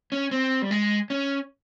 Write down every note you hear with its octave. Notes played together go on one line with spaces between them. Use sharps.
C#4
C4
G3
G#3
C#4